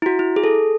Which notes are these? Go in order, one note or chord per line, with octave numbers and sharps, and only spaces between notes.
E4
F#4
E4
G#4
A4